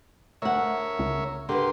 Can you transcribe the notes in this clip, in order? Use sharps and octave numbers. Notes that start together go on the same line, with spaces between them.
D2 A#4 C#5 E5 F#5
C#2
D3 G4 A#4 B4 C6